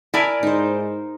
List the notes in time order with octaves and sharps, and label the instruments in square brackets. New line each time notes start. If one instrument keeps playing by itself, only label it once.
[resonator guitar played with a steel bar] E4 D5 G#5 [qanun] A#4
[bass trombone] G#2 [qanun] D#4 C5